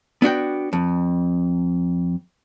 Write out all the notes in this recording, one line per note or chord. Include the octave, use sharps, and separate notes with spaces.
B3 D4 F#4 G5
F2